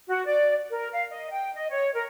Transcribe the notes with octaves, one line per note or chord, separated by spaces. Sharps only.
F#4
D5
A#4
F5
D#5
G5
D#5
C#5
A#4